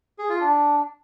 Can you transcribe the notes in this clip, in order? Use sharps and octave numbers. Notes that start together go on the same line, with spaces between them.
G#4
F4
D4